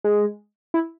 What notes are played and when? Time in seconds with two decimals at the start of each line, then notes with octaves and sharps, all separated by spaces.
0.04 G#3
0.74 E4